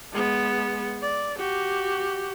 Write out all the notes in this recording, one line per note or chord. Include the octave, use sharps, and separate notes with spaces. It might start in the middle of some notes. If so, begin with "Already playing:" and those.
G#3 B3
D5
F#4 G4